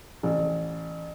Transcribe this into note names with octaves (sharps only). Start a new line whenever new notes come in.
A1